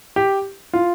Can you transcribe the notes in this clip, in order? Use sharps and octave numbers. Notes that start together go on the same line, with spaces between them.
G4
F4